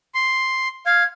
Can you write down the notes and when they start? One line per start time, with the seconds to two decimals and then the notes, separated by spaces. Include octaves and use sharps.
0.15 C6
0.86 F5 G#6